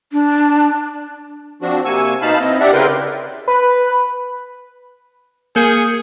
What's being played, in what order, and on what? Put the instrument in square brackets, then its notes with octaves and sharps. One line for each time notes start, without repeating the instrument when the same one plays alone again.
[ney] D4
[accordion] F3 C4 D4 F#4
C3 A#3 G#5 C#6 E6
B2 D#4 F5 A5 B5
C4 E4 D#5
D4 G4 D5 E5 F#5
C#3 E4 A#4 B4 G5 C6
[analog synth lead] B4
[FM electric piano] A#3 G6 C#7 [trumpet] G#4